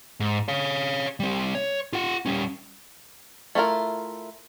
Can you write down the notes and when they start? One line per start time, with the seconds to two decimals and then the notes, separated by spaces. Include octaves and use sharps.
0.20 G#2
0.48 C#5 F5
1.20 G3 C4
1.55 C#5
1.93 F4 F#5
2.26 G3 C#4
3.55 A3 E4 F4 A#4